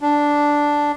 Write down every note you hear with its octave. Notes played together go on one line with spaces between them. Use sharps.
D4